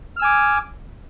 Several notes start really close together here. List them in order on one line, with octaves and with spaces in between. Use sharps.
F6 E6 G#5 D6